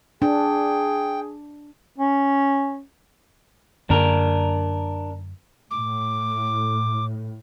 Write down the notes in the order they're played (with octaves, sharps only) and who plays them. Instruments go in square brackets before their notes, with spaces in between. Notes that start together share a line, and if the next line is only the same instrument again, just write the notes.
[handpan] D4 [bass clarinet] G#4 [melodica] G5
[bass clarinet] C#4
[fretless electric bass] F#2 D3 A#3 [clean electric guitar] D4 A#4
[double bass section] A2 [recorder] D6